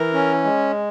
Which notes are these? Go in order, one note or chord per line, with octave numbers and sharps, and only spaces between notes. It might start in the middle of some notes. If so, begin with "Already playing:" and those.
Already playing: E3 A#4
C#4
G#3